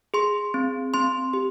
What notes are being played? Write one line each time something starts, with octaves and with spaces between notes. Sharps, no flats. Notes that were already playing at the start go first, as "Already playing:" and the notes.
G#4 C6
C4
C4 C6
G4